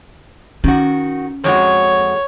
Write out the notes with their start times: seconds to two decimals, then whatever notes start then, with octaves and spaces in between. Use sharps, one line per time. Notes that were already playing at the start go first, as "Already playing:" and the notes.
0.64 D#3 C#4 F#4
1.44 F2 G#3 F#4 C#5